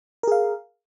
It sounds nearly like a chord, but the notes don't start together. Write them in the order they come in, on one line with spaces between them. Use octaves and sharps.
A#4 G#4 F5